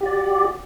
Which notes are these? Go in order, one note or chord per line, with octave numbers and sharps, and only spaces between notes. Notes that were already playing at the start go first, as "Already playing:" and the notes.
F#4 G4 D5